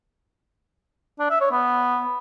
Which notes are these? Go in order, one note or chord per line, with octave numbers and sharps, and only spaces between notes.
D4
E5
C#5
B3